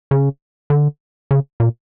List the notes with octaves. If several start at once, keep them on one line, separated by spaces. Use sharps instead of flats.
C#3
D3
C#3
A#2